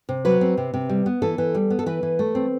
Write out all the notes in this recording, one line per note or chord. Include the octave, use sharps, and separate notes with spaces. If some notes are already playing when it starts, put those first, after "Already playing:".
C3
F#3 B4
C4
C3
C3
G3
B3
E3 A4
E3
G3
B3
A4
E3 B4
E3
A3
C4